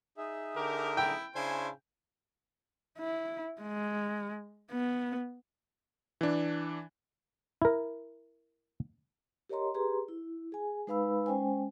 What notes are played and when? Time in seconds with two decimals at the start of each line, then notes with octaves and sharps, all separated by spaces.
0.17 D#4 G#4 E5
0.55 D3 G4 A#4
0.97 E4 G5
1.35 C#3 D4 E4 C5 G#5
2.98 E4
3.61 G#3
4.71 B3
6.21 E3 D4
7.62 E4 A#4
9.49 G4 A#4 C#5 D#5 A#5 C6
9.74 G4 G#4 B4 A#5 C6
10.08 E4
10.52 G#4 G#5
10.87 G#3 D#4 B4 F5 B5 E6
11.26 G#3 C#4 C5 G5 G#5